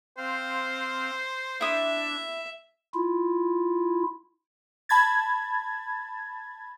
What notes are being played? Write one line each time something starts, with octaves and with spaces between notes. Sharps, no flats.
C4 C5 F5
D4 E4 E5 D#6
E4 F4
A5 B5 G#6 A6